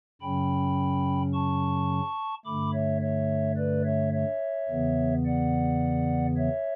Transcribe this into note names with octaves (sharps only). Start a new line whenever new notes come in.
F#2 C#3 F#3 C#4 G5 B5
A5 C#6
G2 D3 A3 B5 D6
C#5 E5
C#5 E5
B4 D5
C#5 E5
C#5 E5
E2 C#3 E3 B3
D5 F#5
C#5 E5